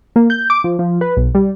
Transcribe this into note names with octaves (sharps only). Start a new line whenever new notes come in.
A#3
G6
D6
F3
F3
B4
B1
G3